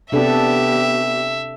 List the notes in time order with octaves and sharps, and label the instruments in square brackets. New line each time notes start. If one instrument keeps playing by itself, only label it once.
[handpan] C3 D4 A4 [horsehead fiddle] B3 G4 [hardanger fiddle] E5